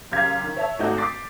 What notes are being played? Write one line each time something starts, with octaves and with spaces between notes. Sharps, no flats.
F#2 C#3 G4 F5 G#6 B6
D#3
C#5 E5 A5
G#1 A3 D4 D#4 F#4 G6
D6 A6 B6 C7